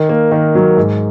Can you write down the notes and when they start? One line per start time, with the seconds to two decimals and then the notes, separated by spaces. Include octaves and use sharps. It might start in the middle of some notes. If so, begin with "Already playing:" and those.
Already playing: D#3
0.09 A#3
0.32 D#3
0.55 F#3
0.77 G#2